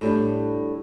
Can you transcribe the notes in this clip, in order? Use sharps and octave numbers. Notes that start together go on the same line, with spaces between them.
A2 G3 D4